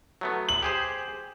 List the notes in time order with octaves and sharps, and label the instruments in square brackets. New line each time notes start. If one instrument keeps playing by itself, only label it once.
[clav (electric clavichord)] F#3 A3 B3
[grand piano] F#7
[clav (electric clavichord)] G4 G#4 C5